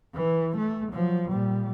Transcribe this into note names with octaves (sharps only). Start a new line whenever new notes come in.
E3
A3
F3 F#3
A#2 G3